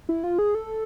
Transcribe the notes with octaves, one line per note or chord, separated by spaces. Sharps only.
E4
F4
G#4
A4